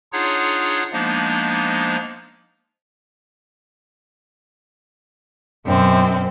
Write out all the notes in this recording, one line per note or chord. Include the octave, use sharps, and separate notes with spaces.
D4 D#4 F4 G#4 C#5 F#5
F3 G#3 A#3 B3 D4 D#4
F#2 B2 C4